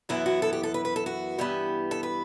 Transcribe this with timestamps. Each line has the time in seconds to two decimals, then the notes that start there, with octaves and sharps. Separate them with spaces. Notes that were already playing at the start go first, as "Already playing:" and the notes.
0.09 F#2 E3 B3 E4 F#4
0.26 F#4
0.42 A4
0.53 G4
0.63 A4
0.74 B4
0.85 B4
0.96 A4
1.06 F#4
1.38 G2 E3 B3 E4 G4
1.91 A4
2.03 B4